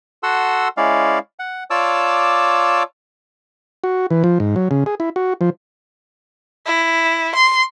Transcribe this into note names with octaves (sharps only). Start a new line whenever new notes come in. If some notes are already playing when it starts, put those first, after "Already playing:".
F#4 A4 F#5 C6 E6
G#3 C#4 E4 D5 F5
F#5
F4 C#5 D5 A5 D6 E6
F#4
E3
F3
G#2
F#3
C#3
G#4
E4
F#4
F3
E4
C6